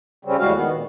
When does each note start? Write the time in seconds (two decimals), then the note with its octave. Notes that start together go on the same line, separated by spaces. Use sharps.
0.25 C#3 G3 C4 C#4
0.39 E2 A2 G3 G#3 F#4 F5
0.53 D#3 B3
0.71 A#2